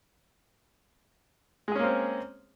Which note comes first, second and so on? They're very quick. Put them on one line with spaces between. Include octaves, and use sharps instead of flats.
G#3 G#4 C#4 A#3 C4